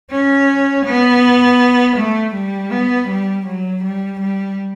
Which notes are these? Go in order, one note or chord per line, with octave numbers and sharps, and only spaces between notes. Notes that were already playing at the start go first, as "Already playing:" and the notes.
C#4
B3
A3
G3
B3
G3
F#3
G3
G3